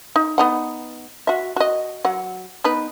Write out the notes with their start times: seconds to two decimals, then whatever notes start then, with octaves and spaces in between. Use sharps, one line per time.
0.16 D#4
0.38 B3 D#4 F#5
1.27 F#4 E5
1.56 F#4 D#5
2.05 F#3 F#5
2.64 B3 D#4 B4